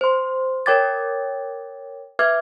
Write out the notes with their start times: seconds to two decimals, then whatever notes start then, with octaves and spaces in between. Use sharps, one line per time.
0.01 C5 C6
0.66 A#4 C#5 G5 D6 G#6 A6
2.19 B4 E5 D6 F6 G#6